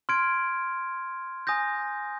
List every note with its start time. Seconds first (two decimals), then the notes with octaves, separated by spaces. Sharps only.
0.09 C6 F6 G#6 D7
1.47 G#5 D#6 G6 A#6